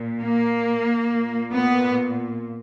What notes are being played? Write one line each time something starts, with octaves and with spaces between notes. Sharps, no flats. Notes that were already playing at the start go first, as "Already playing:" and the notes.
Already playing: A#2
A#3
A#2
B3